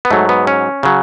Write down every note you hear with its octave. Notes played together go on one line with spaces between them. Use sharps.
B3
G#2 F#3 A3
B3
C#4
C#3 F#3